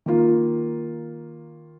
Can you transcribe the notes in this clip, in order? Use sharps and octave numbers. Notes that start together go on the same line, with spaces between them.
D#3 A#3 F4